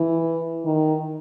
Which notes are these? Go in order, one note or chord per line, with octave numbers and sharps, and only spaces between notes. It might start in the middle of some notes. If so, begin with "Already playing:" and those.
Already playing: E3
D#3